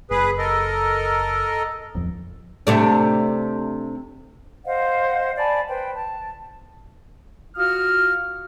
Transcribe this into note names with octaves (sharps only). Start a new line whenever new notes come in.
F#1 G#4 B4
A4 A#4 D#5
D1 F2
C3 A3 D4
C5 D#5 F5 F#5
D5 G#5 A5 B5
B4 C5 G5
A5
F4 F#4 D#6 F6